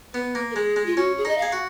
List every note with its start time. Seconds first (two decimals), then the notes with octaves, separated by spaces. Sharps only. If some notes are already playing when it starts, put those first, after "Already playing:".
0.14 B3 B4
0.35 A#3
0.51 A#4
0.56 G#3 G#4
0.76 G#3
0.86 F4
0.97 C#4 F#4
1.18 G#4
1.25 D#4 D#5
1.38 G#4 F5
1.52 F#4